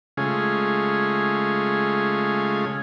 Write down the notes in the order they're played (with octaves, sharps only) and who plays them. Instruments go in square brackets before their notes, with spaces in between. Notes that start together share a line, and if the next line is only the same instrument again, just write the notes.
[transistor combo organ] C#3 G#3 A3 C#4 F4 G#4